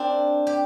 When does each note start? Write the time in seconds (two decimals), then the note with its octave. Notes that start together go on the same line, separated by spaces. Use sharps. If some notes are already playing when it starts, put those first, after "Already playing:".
Already playing: A#3 C4 D4
0.47 G4